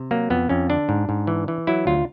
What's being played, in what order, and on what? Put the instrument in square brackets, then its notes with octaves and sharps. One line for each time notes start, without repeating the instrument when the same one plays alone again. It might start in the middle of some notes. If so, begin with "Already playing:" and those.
Already playing: [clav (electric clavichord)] C3
F#3 A#3
F2 B3
F2 C#4
D3 D4
G#2
G#2
E3
E3
F#3 E4
D2 F4